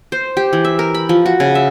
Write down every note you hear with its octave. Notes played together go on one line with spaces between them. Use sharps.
C5
G4
E3
E5
A#4
B5
F3
F#4
C#3
E5